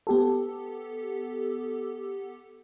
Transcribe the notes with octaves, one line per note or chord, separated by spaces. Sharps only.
B3 G4 A4